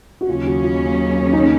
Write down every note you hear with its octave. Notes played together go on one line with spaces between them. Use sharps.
F#4
D#2 C#3 F#3 C#4 F4
F#4
F4
D#4